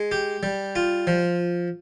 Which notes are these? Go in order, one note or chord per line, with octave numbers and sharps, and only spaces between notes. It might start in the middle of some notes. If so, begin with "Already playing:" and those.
Already playing: G#3
G4
G3
F4
F3